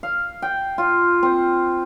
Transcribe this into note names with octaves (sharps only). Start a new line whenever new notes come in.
F5
G5
F4
C4